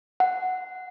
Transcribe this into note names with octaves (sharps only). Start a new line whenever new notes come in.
F#5